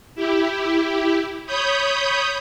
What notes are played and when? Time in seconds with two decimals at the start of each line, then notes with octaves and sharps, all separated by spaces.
0.15 E4 G4
1.46 C#5 B5 D#6 G6